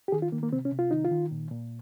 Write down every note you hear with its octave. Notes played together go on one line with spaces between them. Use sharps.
G4
D#3 G#4
F4
D#3 A#3
A#3
C3 C4
C#4
C3
F4
D#3 D#4
F4
D#3
A#2
A#2